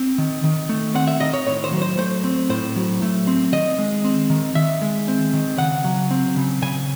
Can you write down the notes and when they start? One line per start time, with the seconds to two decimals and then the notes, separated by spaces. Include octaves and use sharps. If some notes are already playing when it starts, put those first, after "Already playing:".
Already playing: C4
0.18 D#3
0.44 D#3
0.69 A3
0.95 C4 F#5
1.07 E5
1.20 D#3 D#5
1.34 C#5
1.46 A2 C#5
1.64 C5
1.72 F#3
1.82 C5
1.98 A3 C5
2.24 C4
2.49 A2 C5
2.76 F#3
3.02 A3
3.27 C4
3.52 D#3 D#5
3.79 G#3
4.04 C4
4.30 D#3
4.55 D#3 E5
4.82 G#3
5.08 C4
5.33 D#3
5.58 C#3 F#5
5.84 F#3
6.11 C4
6.36 C#3
6.62 C#3 G#5